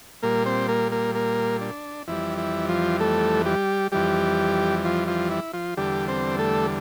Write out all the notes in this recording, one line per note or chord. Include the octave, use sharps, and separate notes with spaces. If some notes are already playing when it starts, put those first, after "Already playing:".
A#2 G3 A#3 A#4
C4 C5
A#3 A#4
A#3 A#4
A#3 A#4
D4
F2 E3 G3 E4
E4
F3 F4
A3 A4
G3 G4
F2 E3 G3 G4
F3 F4
F3 F4
E4
F3 F4
E2 D3 G3 G4
C4 C5
A3 A4